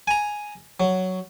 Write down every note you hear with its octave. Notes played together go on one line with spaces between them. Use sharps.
G#5 A#5
F#3